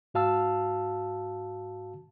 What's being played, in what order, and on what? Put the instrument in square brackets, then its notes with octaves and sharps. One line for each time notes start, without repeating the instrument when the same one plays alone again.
[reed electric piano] G#2 F#4 F5 A5 E6